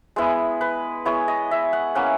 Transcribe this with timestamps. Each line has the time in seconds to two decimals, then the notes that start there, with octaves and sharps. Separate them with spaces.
0.16 G#3 B3 E4
0.61 B4
1.05 G#3 B3 E4 C#5
1.28 D#5
1.51 E5
1.73 F#5
1.95 A#3 C#4 E4 F#5